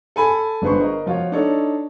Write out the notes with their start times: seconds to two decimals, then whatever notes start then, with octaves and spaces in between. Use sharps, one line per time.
0.16 A4 G#5 B5
0.62 G1 D3 G#4 B4 C5 C#6
0.81 A#4 D#5
1.06 F3 F4 F#4 C#5
1.32 D4 D#4 A4 C#5